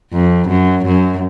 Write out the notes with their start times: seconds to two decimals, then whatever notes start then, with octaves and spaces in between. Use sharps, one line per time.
0.12 F2
0.48 F#2
0.86 F#2